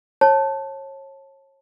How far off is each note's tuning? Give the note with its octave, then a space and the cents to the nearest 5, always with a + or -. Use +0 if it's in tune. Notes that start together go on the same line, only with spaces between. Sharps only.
C#5 -30 A5 +0